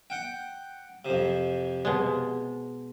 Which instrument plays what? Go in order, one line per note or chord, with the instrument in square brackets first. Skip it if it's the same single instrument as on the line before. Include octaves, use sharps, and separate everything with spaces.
[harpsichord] F#5 G5
F2 C3
[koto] B2 G#3